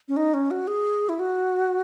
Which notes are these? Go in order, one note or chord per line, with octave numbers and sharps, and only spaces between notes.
C#4
D#4
C#4
F#4
G#4
E4
F#4